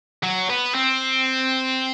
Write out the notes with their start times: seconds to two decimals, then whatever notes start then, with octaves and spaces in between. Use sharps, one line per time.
0.23 F#3
0.50 B3
0.75 C4